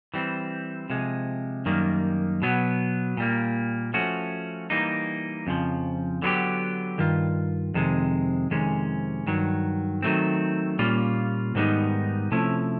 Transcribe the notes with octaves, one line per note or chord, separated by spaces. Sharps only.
E3 G3 C4
C3 F3 G#3
F#2 D#3 G3 A#3
B2 F#3 B3
A#2 G3 A#3
F3 A3 C#4 F#4
E3 G3 A#3 D#4
F2 C#3 F3
D3 F#3 B3 D#4 G4
G2 D#3 F4
F2 C3 D#3 G#3
F2 C3 D#3 G#3 C#4
G2 D#3 F#3
D#3 F#3 A3 C4
A#2 G3 A#3 C#4 F4
G#2 D#3 G3 B3 D#4
C3 F3 A3 C#4 E4